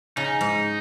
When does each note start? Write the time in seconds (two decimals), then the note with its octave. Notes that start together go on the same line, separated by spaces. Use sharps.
0.17 C#3 D#4
0.41 G#2